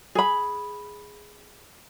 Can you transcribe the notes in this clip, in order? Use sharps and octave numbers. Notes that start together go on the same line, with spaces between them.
G#4 B5